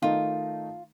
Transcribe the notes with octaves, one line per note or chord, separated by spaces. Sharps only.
D#3 A3 D#4 F4